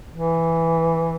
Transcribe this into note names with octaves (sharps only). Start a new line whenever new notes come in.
E3